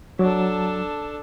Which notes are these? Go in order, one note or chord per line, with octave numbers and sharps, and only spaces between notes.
F#3 D4 A4